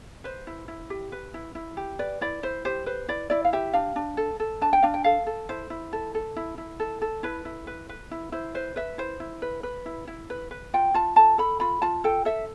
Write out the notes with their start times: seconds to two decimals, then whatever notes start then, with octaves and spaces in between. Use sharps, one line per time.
0.24 B4 C5
0.47 E4
0.68 E4
0.90 G4
1.12 B4
1.34 E4
1.55 E4
1.77 G4
1.99 B4 D5
2.21 E4 D5
2.43 E4 C5
2.65 G4 C5
2.86 B4 C5
3.08 E4 D5
3.30 E4 D5
3.45 F5
3.53 G4 E5
3.73 D4 F5
3.96 D4
4.17 A4
4.40 A4
4.61 D4 A5
4.73 G5
4.83 D4 F5
4.94 G5
5.04 A4 F5
5.27 A4
5.49 E4 C5
5.70 E4
5.93 A4
6.15 A4
6.36 E4
6.58 E4
6.80 A4
7.02 A4
7.23 E4 B4
7.45 E4
7.67 B4
7.89 B4
8.11 E4
8.32 E4 C5
8.54 B4 C5
8.76 B4 E5
8.98 E4 C5
9.20 E4
9.42 B4
9.63 B4
9.86 E4
10.07 E4
10.30 B4
10.51 B4
10.74 F4 G5
10.94 F4 A5
11.16 A4 A5
11.38 A4 B5
11.60 F4 B5
11.82 F4 A5
12.04 A4 G5
12.25 A4 E5